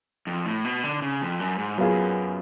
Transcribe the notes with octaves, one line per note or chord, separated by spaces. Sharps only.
F2
A2
B2
D3
C#3
F2
F#2
G#2
F#2 F#3 B3 F4 G#4